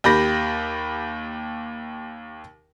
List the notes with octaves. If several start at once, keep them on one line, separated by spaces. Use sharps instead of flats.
D#2 G4 B5 A#6